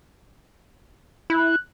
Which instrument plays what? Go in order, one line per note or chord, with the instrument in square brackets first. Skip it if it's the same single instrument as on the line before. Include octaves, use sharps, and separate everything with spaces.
[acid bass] E4 [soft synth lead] F#6